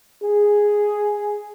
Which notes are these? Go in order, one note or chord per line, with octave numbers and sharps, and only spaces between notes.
G#4